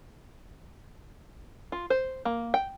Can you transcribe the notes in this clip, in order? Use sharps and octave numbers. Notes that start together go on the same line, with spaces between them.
F4
C5
A#3
G5